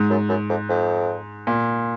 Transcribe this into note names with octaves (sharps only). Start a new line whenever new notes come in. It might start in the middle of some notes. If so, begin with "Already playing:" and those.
Already playing: G#2
F#2
F#2
F2
F2
A#2